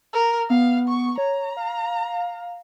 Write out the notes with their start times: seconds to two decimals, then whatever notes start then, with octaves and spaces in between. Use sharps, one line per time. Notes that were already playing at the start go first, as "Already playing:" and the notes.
0.13 A#4
0.50 B3 F5
0.88 C#6
1.18 C#5 A#5
1.57 F5